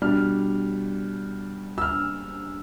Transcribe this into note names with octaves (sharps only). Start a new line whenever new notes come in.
B2 G3 D4 F6
E6
F6